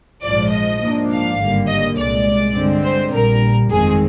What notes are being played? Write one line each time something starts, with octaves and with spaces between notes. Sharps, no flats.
A#1 G#2 F3 G#3 D5
D#5
G#2 F3 A#3 D4
F5
G#1 G2 D3 G3 A#3
D#5
C2 A#2 G#3 D5
G2 D3 G#3 C4
C5
A#1 A#2 G3 A#4
G1 F2 D#3 G#3 C4 G#4